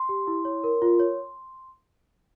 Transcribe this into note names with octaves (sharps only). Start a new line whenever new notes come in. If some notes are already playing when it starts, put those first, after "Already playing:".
Already playing: C6
G4
E4
C#5
A#4
F4
C#5